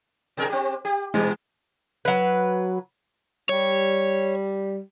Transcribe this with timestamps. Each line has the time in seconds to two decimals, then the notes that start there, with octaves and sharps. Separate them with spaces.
0.37 B2 G#4 A#4
0.50 C4 G4
0.85 G4
1.14 A#2 E3 G#3
2.05 F#3 B4
3.49 G3 C#5